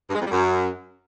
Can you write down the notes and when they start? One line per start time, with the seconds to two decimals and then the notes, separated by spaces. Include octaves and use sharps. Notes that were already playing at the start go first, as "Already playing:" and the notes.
0.09 G2
0.15 G#3
0.20 F2
0.26 G3
0.31 F#2